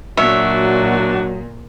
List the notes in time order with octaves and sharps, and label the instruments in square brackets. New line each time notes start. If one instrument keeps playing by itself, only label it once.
[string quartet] A#2 [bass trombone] F#3 [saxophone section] D4 D#4 F#4 [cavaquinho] C#5 E5